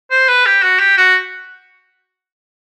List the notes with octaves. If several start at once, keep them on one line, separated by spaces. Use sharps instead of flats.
C5
B4
G4
F#4
G4
F#4